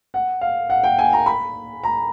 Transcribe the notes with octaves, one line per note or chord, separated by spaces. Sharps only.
F#5
F5
F#5
G5
G#5
A#5
B5
A#5